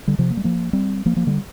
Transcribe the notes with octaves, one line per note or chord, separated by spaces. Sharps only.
D3 G3
C3 F3
A#3
G3
F3 A#3
G3 C4
F3 A#3
F3 A#3
D3 G3